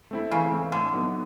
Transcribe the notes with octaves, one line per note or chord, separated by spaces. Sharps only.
A3 C4 E4
C#3 E3
A3 C4 E4
A2 D3
F#3 B3 D#4